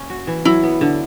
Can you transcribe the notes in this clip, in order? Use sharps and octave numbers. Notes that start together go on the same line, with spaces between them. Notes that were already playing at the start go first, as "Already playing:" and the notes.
Already playing: A#3 C#4
F#4
E3
F#3 E4
B3
D3